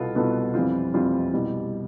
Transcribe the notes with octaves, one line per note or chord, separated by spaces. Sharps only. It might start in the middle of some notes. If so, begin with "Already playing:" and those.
Already playing: C2 B2 B3 F4 A4
C2 B2 B3 F4 A4
F2 E3 G3 C4 F4
F2 E3 G3 C4 F4
C2 B2 G3